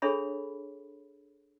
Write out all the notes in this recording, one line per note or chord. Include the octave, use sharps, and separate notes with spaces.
D4 G#4 A4 C#5 E5 B5